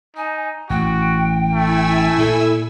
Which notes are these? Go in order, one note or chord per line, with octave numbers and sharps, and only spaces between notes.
D#4 G#5
A1 F#4 G5
A3 E4 G#5 E6
A#2 A4